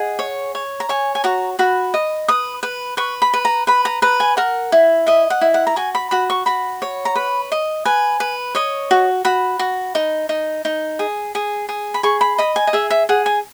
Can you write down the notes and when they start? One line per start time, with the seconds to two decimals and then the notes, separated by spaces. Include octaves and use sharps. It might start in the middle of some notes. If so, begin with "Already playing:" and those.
Already playing: G#4 D#5 F#5
0.19 C#5
0.55 C#5
0.80 A#5
0.89 C#5 G#5
1.15 G#5
1.24 F#4 A#5
1.59 F#4 B5
1.94 D#5
2.28 B4 D#6
2.63 B4
2.97 B4 C#6
3.22 B5
3.34 B4
3.45 A#5
3.67 B4 B5
3.85 A#5
4.02 B4 A#5
4.20 G#5
4.37 A#4 F#5
4.72 E4
5.07 D#5 E5
5.30 F#5
5.41 E4
5.54 F#5
5.67 A#5
5.76 F#4 G#5
5.95 B5
6.11 F#4 B5
6.30 C#6
6.46 F#4 B5
6.82 C#5
7.05 A#5
7.15 B4 B5
7.52 D#5
7.85 B4 G#5
8.20 B4
8.55 C#5 D#5
8.91 F#4
9.25 F#4 B5
9.59 F#4
9.95 D#4
10.29 D#4
10.65 D#4
10.99 G#4
11.35 G#4
11.69 G#4
11.94 B5
12.03 G#4 C#6
12.21 B5
12.38 D#5 B5
12.56 G#5
12.67 D#5
12.73 G#4 E5
12.90 E5
13.09 G#4 F#5
13.26 G#5